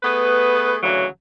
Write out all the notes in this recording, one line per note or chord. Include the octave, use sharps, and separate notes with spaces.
A3 B3 G#4 B4
D2 C#3 E3 F#3